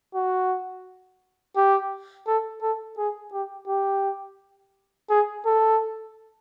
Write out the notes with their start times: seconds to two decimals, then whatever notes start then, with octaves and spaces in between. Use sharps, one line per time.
0.15 F#4
1.56 G4
2.27 A4
2.62 A4
2.98 G#4
3.33 G4
3.68 G4
5.10 G#4
5.45 A4